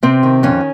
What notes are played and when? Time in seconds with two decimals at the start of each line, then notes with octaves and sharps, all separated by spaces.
0.03 C3 C4
0.23 D#3
0.43 F2 C#4